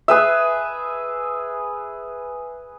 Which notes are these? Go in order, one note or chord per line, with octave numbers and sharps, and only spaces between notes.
G#4 B4 E5